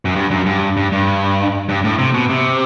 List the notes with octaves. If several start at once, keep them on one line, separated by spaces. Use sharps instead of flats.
F#2
G2
F#2
G2
G2
G2
G2
A2
C3
B2
C3